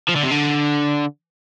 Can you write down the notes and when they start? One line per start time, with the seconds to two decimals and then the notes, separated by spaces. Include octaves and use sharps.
0.08 F3
0.16 D3
0.23 C3
0.31 D3